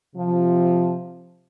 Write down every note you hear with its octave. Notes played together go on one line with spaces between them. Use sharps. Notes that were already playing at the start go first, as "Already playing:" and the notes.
C3 F3